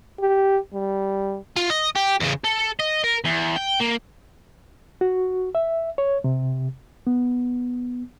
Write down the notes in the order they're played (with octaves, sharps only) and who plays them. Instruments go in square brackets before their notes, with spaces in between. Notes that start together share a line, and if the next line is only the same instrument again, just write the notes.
[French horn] G4
G3
[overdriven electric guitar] F4
D#5
G4
E2 C#3
[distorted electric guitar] A4
D#5
A#4
E2
G5
A#3
[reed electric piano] F#4
E5
C#5
C3
B3